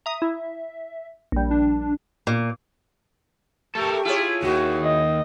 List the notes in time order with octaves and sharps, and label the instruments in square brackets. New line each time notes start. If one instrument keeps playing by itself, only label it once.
[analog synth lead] E5 [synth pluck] A#5 D#6
[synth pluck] E4
A#1 G3
[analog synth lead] D4
[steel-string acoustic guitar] A#2
[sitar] A3 [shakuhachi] G4 [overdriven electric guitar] A4 A#4
[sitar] E4 G#4 C#5 [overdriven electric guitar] F4
[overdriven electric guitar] D#2 D#3 [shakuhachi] F#4
[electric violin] D#5